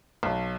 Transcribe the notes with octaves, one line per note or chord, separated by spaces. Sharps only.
B1